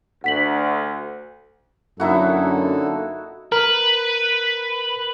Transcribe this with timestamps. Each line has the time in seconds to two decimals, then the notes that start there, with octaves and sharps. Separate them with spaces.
0.24 D2 F#5 B6 F#7
2.00 F#2 D3 A#3 D#4 E4 F#4 A4
3.52 A#4 B4